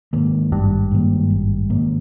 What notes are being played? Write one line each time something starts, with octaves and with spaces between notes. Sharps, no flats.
G#2 D#3 A#3
G#1 G2
G#2 D#3 A#3
G#1
G#2 D#3 A#3